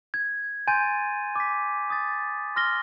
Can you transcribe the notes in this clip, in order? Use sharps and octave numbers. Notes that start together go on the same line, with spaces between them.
G#6
G#5 C6 G6 A6 D#7
D6 B6
D#6 A6
C6 F6 A#6 G7